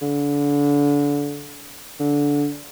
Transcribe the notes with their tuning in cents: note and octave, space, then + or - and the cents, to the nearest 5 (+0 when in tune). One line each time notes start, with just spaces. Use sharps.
D3 -30
D3 -20